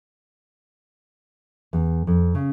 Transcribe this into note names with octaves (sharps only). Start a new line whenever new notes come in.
E2
F2
C#3